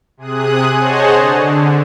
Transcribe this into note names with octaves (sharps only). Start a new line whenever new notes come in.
C3 G#4 D#6 F#6
G#4 C5 C#5 D#5 F#5 A5
D3